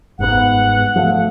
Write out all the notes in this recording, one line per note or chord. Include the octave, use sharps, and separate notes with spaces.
G1 G#2 B3 F#5
F3 A3